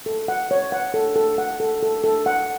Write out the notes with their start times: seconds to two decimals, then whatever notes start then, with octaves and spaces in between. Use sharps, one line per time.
0.06 A4
0.28 F#5
0.51 C#5
0.72 F#5
0.94 A4
1.16 A4
1.38 F#5
1.60 A4
1.83 A4
2.04 A4
2.26 F#5